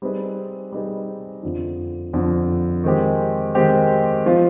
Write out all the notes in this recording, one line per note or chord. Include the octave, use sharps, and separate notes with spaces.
G3 C4 D#4 G#4 B4
G3 C4 D#4 G#4 B4
F2 D3 F3
F2 D3 F3
D#3 G#3 C4 G4
D#3 G#3 C4 G4
F3 C4 F4